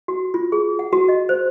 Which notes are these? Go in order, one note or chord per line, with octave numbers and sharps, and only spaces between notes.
F#4
F4
G#4
F#5
F#4
D#5
C5